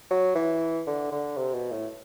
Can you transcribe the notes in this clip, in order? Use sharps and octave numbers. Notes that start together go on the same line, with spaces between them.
F#3
E3
D3
D3
C3
B2
A2